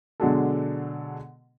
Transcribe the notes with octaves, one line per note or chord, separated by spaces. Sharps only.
B2 D3 F#3 G#3 D4 A4